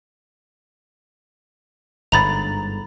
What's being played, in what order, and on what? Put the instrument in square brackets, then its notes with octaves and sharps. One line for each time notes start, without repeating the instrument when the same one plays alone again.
[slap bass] G1 G#2 D3 [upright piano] A#5 A6 [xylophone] B5 F7